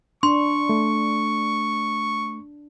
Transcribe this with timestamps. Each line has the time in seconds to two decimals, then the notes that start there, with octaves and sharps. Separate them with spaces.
0.23 D4 C6 C#6
0.69 A3